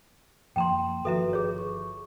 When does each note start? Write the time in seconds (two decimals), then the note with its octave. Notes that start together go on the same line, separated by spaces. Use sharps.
0.56 F#2 F3 A#3 G5 A#5 C6
1.05 G1 D#3 F3 F#4 A4 B4 E5 A#5
1.33 G#4 C#5
1.58 C#6